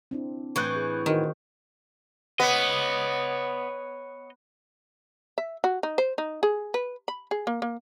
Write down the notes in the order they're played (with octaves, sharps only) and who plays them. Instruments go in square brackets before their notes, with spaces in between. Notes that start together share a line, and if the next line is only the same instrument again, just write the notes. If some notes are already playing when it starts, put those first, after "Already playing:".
[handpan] C4 D4 E4
[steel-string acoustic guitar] A2 E3 [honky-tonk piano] C#6 F#6 G6
[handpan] G#4
[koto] D#3 [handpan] D#4 F#4 C5
[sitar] B3 [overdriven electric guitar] C#5 D#5
[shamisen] E5
F#4
D#4
C5
D#4
G#4
B4
B5
G#4
A#3
A#3